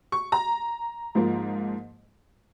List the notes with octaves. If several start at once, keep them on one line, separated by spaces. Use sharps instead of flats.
C#6
A#5
G#2 F3 A#3